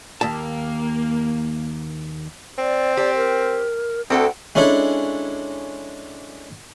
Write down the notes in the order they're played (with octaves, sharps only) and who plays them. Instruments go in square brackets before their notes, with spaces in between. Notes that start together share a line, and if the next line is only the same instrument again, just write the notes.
[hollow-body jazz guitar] D#2 A5 [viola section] A#3
[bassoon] C4 [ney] D5
[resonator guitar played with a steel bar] G4 [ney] D5
[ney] A#4
[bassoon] D2 [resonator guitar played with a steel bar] C4 A4 G5 [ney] F#5
[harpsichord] G#3 C#4 D4 E4 A4